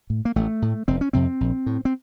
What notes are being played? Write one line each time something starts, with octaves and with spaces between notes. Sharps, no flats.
A2
A#3
A1 A3
A2
F1 C4
C#4
F2 C3 C4
A#1
A2
C4